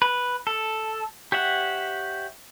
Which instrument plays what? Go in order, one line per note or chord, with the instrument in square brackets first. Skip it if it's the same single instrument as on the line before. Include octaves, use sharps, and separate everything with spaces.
[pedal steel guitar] B4
A4
G4 C#5 E5 F#5